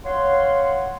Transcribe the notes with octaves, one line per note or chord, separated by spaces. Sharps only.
C#5 F5 F#5 C6